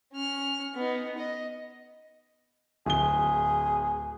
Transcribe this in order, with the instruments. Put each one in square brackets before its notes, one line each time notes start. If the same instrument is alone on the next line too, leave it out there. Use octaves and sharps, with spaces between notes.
[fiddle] C#4 F6
B3 D#4
D#5
[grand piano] D1 G7 [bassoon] G#4